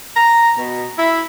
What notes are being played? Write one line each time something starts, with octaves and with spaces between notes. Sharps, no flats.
A#5
B2
E4